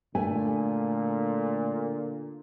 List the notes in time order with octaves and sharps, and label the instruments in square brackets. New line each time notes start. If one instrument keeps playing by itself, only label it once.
[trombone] A#2 [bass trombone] D3 [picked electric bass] A3 [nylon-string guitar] G#5